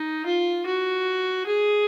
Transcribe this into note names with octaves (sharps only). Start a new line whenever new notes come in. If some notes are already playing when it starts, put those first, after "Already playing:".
Already playing: D#4
F4
F#4
G#4